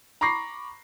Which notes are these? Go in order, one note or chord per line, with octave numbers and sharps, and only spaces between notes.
A#5 B5 C#6 D6 A#6 C7